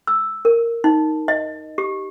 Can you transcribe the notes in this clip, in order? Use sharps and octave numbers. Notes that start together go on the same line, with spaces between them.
E6
A#4
D#4
D#5
G4